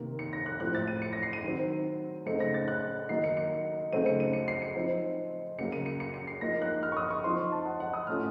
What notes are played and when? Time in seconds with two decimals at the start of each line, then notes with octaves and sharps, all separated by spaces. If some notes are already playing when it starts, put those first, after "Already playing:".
Already playing: C3 D#3 A#3
0.19 C#7
0.33 A#6
0.46 F#6
0.60 A2 F3 C4 F#6
0.75 A6
0.88 D#7
1.02 C#7
1.13 A#6
1.23 C7
1.33 D#7
1.44 D#3 F#3 C4
2.26 C#3 A3 C4 D#4 C#7
2.40 A#6
2.54 A6
2.68 F#6
3.09 D#3 F#3 A#3 D#4 C7
3.24 C#7
3.37 C#7
3.92 C#3 F#3 A3 C4 D#4 D#7
4.06 C#7
4.20 D#7
4.33 C#7
4.48 C7
4.62 C#7
4.75 F3 C4 D#4
5.58 C#3 F#3 A#3 C#7
5.72 D#7
5.86 C#7
6.00 C#7
6.14 C#7
6.27 C7
6.41 F3 A#3 D#4 A#6
6.62 F#6
6.83 F6
6.92 C#6
6.97 D#6
7.11 C#6
7.24 F3 C4 D#4 C6
7.52 A5
7.65 F#5
7.80 F#5
7.94 D#6
8.07 A2 A3 C#4 F4 F6